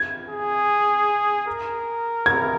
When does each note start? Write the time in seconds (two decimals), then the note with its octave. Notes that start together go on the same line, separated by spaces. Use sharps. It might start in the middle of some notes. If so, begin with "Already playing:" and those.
Already playing: G#6
0.28 G#4
1.47 A#4
2.26 G#6